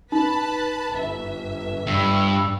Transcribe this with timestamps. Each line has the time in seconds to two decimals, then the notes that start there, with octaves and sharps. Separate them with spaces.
0.12 D#4 B4 A5 B5
0.92 G1 B4 E5
1.87 G2 E6